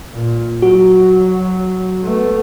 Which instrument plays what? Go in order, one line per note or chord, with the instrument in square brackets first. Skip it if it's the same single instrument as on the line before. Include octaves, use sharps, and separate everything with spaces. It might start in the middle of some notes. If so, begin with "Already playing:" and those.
[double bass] A#2
[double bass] F#3 [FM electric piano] F#4
[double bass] A3 B3